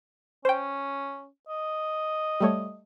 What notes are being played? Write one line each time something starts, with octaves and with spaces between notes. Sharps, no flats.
C#4 C5 G5
D#5
G3 A3 C#5